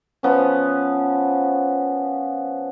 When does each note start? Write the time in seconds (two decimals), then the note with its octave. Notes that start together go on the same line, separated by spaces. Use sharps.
0.23 F3 B3 C#4